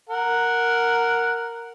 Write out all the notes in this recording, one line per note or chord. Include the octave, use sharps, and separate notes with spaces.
A#4 F#5